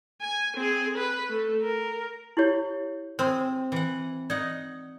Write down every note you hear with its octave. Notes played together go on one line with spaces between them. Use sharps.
G#5
C4 G#4
B4
A3
A#4
E4 G4 C#5
C4 G#4 C5 C6
E3 F#5
D#4 D5 F#5